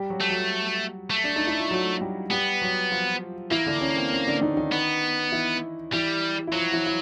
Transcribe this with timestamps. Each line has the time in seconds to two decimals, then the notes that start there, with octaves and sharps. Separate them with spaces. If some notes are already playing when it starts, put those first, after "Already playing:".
Already playing: G3 G4
0.10 F#3 F#4
0.21 A3
0.29 F#3 F#4
1.11 A3
1.24 D4
1.36 D#4
1.47 E4
1.60 F4
1.71 F#3 F#4
2.01 G3 G4
2.30 G3 B3 G4
2.62 F#3 F#4
2.91 F3 F4
3.51 E3 A#3 E4
3.66 D3 D4
3.81 C#4
3.97 C4
4.12 C#4
4.27 D3 D4
4.41 D#3 D#4
4.57 D#3 D#4
4.72 B3
5.32 E3 E4
5.93 E3 G3 E4
6.47 E4
6.53 F3 F#3 F4
6.73 E3 E4
6.86 E4